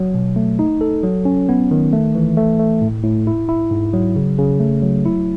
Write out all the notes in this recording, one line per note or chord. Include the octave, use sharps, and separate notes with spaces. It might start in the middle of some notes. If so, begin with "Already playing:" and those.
Already playing: F#3
B2
A3
D#4
A4
F#3
C#4
B3
D#3
A3
E3
A3
A3
A2
A2
E4
E4
G#2
F#3
C#3
C#3
A3
F#3
E4